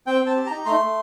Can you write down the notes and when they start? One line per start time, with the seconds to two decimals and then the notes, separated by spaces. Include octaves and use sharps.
0.07 C4 G5
0.21 C4
0.26 A5
0.36 G4
0.46 D#4 A#5
0.66 A3 C6
0.80 A3